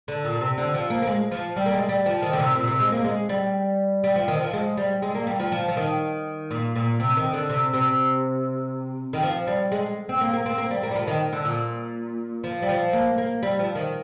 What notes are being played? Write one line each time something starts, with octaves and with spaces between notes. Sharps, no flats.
D3
A#2
C3
D3
F3
A#3
A#3
G#3
F3
G3
A#3
G#3
G3
F3
D#3
D3
C3
A#2
C3
G#3
A#3
G#3
G3
G3
F3
D#3
F3
G#3
G3
G#3
A#3
G3
F3
F3
F3
D#3
A#2
A#2
C3
D#3
D3
C3
C3
D#3
F3
G3
G#3
C4
A#3
A#3
C4
A#3
G3
A#3
G3
F3
D#3
D3
A#2
F3
G3
F3
A#3
A#3
G3
F3
D#3